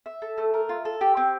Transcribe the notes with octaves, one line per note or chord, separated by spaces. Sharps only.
E5
A4
A3
A#4
F4
A4
G4
C4